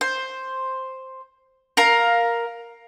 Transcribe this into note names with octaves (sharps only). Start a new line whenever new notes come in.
C5
A#4 F5 A#5